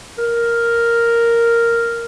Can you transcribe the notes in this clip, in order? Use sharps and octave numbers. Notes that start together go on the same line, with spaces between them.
A#4